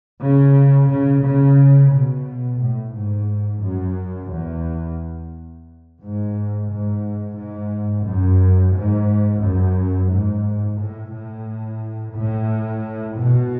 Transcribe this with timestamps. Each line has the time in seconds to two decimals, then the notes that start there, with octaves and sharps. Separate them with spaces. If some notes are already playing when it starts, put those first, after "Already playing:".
0.21 C#3
0.89 C#3
1.23 C#3
1.92 B2
2.59 A2
2.93 G#2
3.62 F#2
4.30 E2
6.00 G#2
6.69 G#2
7.36 G#2
8.05 F#2
8.73 G#2
9.41 F#2
10.09 G#2
10.77 A2
11.12 A2
12.14 A2
13.16 B2